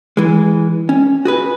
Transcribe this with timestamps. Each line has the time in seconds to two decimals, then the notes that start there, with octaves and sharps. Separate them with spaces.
0.17 E3 G#3
0.89 C#4
1.25 F#4 G#4 B4